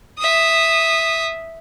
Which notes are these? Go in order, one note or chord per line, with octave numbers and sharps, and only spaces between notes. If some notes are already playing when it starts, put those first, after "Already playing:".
E5 D#6